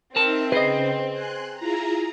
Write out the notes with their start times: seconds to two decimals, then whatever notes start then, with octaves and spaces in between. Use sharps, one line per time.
0.16 C4 D#4 A#4 E5 A5
0.52 C#3 G#4 B4 C5 D#5
1.11 G#5 C6 F#6
1.58 E4 F4 G#4 A#5